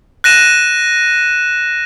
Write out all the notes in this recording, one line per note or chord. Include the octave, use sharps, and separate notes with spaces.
F#6 A#6 D#7 E7